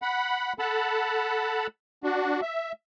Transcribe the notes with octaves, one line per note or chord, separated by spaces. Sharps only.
F#5 B5
A4 F#5 A5 B5
D4 F#4
E5